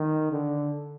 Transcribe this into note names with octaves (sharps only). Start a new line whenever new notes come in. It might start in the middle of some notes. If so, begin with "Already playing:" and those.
Already playing: D#3
D3